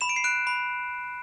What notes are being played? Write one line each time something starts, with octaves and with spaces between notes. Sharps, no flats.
B5 E7
D7
C7
F#6 D7
B5